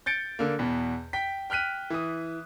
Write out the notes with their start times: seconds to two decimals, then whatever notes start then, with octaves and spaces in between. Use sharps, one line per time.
0.06 G6 A6 C#7 D7
0.39 D3 A#3
0.59 E2 B2
1.13 G5 B6
1.50 G5 F6 F#6 B6 D#7
1.90 E3 D#6